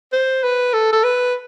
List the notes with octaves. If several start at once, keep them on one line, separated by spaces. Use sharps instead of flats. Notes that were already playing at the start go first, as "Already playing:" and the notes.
C5
B4
A4
A4
B4